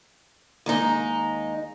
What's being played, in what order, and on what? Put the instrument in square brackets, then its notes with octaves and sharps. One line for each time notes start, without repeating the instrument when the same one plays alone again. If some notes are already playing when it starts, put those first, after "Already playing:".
[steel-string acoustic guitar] D#2 G#3 D#4